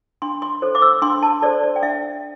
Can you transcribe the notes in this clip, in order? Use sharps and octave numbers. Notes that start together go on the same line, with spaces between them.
D4 C6
C6
A4 C5
D6
E6
D4 C6
A5
A4 C5 D5
D5
G5
D4 E5